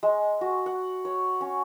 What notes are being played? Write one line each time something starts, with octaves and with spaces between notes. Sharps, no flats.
G#3
F#4
F#5
C#5
C#4